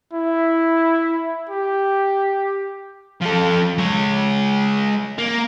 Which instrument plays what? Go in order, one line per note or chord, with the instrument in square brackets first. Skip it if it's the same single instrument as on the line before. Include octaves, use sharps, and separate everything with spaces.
[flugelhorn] E4
G4
[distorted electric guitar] F3 A4
G#3 C#5
A#3